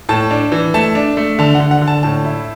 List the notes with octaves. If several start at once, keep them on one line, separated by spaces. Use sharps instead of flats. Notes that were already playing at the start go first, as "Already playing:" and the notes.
A2 A5
D4
E3
A3 A5
D4
A3
D3 A5
F#5
D3
F#5
D3
A5
A2 A5
E4